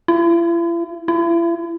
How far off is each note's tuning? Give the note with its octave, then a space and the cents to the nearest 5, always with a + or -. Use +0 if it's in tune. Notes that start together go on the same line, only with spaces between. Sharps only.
E4 +45
E4 +40